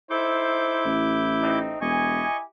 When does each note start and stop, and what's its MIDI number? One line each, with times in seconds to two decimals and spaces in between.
0.10 0.90 63
0.10 1.59 64
0.10 0.90 69
0.10 0.90 72
0.10 1.59 86
0.10 1.59 91
0.85 1.73 33
1.42 1.79 57
1.42 1.79 60
1.42 1.79 63
1.81 2.23 28
1.81 2.43 64
1.81 2.43 67
1.81 2.37 75
1.81 2.43 80
1.81 2.37 85